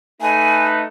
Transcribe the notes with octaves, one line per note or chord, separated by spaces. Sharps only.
A3 D#4 B4 G#5